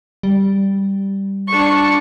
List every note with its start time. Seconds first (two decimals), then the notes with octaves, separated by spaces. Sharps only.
0.23 G3
1.48 D4 F4 C#6